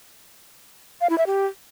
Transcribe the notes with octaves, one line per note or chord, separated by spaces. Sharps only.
F5
E4
E5
G4